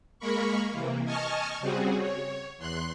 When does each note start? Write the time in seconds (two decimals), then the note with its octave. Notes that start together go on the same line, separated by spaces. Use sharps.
0.19 G#3 A#3 A#4 B5 C#6
0.71 C3 E3 A#3
1.05 D#5 G#5 A5 C#6 F6
1.60 C#3 G3 C4 F#4 G#4
1.99 C#5
2.58 E2 C6 F#6